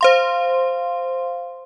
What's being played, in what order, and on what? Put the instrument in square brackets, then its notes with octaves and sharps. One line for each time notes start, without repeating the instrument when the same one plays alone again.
[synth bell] C5 F5 C6